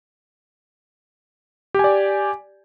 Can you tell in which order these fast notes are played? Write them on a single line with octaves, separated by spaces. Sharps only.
G4 G#5 D5